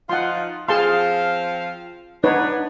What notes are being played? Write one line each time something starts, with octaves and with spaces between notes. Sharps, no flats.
F3 D#4 F4 F#5 C6
F3 C4 G#4 F5 A5 C6
B3 D4 D#4 B4 C#5